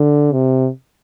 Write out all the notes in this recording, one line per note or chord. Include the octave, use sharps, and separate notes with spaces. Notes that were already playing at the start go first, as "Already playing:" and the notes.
Already playing: D3
C3